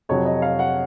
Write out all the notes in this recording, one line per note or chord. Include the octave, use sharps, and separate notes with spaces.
F2 C3 F#3 C#5
D#5
F5
F#5